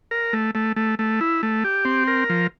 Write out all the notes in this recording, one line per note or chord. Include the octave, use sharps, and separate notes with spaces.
A#4
A3
A3
A3
A3
E4
A3
G4
C4
A#4
F3